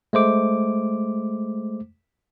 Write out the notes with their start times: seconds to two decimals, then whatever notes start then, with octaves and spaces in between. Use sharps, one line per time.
0.13 G#3 A3 C5 D6